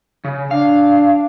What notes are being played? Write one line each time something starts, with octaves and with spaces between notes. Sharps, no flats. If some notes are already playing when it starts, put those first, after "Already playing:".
C#3
D4 F5